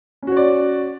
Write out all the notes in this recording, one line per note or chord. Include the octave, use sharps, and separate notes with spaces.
C#4 F#4 C#5 D5